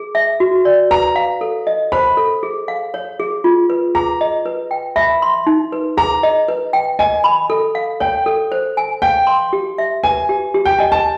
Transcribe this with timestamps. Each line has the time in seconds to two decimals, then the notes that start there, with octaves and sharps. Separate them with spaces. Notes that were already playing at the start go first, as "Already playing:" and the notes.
Already playing: G#4
0.15 E5
0.40 F#4
0.65 D5
0.91 B4 A#5
1.16 F5
1.41 A4
1.67 D#5
1.92 C5 B5
2.17 A4
2.43 G#4
2.68 F5
2.94 C#5
3.20 G#4
3.44 F4
3.70 B4
3.95 G#4 A#5
4.21 D#5
4.46 B4
4.71 G5
4.96 E5 B5
5.22 C6
5.47 D#4
5.72 B4
5.97 G#4 A#5
6.23 D#5
6.48 B4
6.73 G5
6.99 D#5 G#5
7.24 B5
7.50 A4
7.75 F5
8.00 C#5 G5
8.26 A4
8.52 C5
8.77 G#5
9.02 F5 G5
9.27 C6
9.53 G4
9.78 E5
10.03 B4 G#5
10.29 G4
10.54 G4
10.65 G5
10.79 D#5 G#5
10.92 A5